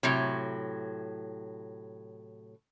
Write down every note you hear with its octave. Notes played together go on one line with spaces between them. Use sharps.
A2 C3 F#3